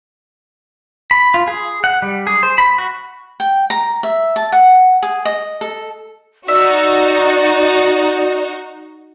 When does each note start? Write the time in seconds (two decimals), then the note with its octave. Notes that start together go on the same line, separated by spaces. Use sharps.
1.11 B5
1.34 F4
1.48 G#4
1.84 F#5
2.02 G3
2.27 G#4
2.43 C5
2.58 B5
2.78 F#4
3.40 G5
3.70 A#5
4.03 E5
4.36 A5
4.52 F#5
5.03 G#4
5.25 D#5
5.61 A4
6.48 D#4 F#4 D5 E5